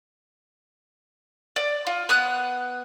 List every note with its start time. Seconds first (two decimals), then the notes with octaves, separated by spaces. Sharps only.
1.56 D5
1.87 F4
2.09 B3 D#6 F#6